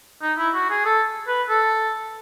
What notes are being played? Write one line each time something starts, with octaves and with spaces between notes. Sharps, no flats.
D#4
E4
F#4
G#4
A4
B4
A4